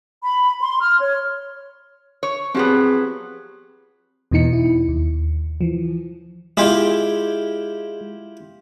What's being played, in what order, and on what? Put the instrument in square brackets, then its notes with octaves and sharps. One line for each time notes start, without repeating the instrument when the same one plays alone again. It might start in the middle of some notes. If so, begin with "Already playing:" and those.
[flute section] B5
C6
F6
C#5
[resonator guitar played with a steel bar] C#5
[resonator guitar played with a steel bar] F3 F#3 B3 [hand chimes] C4 G4 G#4
[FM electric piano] E2 B2 E3 D#4 C#7
E4
D#2
E3 F3
[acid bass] G#3 [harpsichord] E4 F4 G4